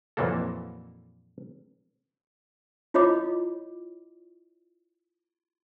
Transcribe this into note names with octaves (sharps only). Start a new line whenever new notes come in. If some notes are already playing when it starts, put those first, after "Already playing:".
F2 A#2 E3 F#3 A#3 A4
E4 F4 C#5 D#5 B5 D6